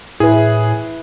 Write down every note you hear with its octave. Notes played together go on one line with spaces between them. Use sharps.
A2 E4 G#4 B4